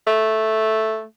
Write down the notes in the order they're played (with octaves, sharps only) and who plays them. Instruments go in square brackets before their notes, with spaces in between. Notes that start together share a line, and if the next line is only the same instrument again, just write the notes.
[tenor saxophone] A3